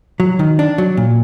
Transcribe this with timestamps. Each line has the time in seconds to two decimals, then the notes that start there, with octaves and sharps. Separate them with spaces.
0.20 F#3
0.39 D#3
0.59 D4
0.78 F#3
0.97 A#2